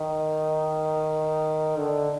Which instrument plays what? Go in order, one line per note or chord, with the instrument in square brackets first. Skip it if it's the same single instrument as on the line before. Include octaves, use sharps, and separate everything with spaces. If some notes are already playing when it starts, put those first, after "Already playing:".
Already playing: [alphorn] D#3
D3